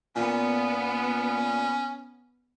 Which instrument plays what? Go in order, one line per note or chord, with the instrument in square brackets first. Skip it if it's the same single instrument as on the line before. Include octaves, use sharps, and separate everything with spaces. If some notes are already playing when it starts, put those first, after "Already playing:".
[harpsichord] A#2 [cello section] B3 [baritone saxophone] C#4